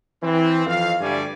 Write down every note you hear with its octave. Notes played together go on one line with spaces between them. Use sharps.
E3 C4
F2 F5
D2 G2 G3 A3 D5 G#5